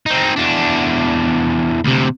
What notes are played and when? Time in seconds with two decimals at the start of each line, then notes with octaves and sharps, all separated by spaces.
0.06 C4 D#4
0.36 E2 D4
1.84 D2 C3